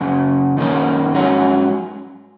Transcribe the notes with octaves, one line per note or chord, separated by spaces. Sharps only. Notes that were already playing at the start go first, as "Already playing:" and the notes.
F#2 C#3
F#2 D#3 A#3 C#4
G#2 F#3 C#4